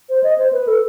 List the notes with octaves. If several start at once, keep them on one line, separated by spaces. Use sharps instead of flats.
C5
D#5
C5
B4
A4